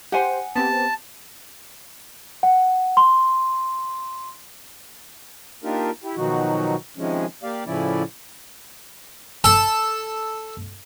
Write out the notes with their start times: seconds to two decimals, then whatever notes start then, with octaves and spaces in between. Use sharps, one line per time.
0.12 G4 C5 F#5 G#5
0.56 B3 C4 G4 A5
2.43 F#5
2.97 C6
5.64 A#3 D4 D#4 F4 G4 A#4
6.03 E4 G4
6.16 B2 D#3 F3 F#3 D#4 F#4
6.97 C3 D#3 F3 G#3 C#4
7.43 A#3 G4 D5 F5
7.66 A2 C#3 F3 C#4 E4 D5
9.44 A4